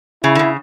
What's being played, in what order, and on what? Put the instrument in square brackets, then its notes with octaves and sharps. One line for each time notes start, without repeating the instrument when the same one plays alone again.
[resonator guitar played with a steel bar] C#3 [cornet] E4
[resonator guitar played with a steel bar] D3
C#3